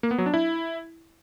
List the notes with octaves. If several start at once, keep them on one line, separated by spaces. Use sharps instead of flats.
A#3
B3
F#3
D4
E4